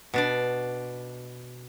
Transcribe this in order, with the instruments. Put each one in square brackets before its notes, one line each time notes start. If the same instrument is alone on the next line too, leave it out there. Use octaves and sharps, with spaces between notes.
[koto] B2 D4 D5